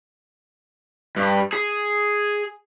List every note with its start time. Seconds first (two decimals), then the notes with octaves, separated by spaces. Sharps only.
1.16 G2
1.53 G#4